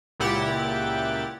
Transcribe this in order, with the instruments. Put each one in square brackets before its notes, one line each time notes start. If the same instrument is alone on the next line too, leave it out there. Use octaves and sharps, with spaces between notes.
[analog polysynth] C#2 A#2 E4 G4 F#5 A6